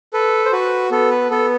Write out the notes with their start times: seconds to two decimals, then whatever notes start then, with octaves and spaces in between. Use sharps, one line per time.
0.13 A4 B4
0.45 C5
0.52 F#4 B4
0.91 B3 A4
1.10 B4
1.31 B3 A4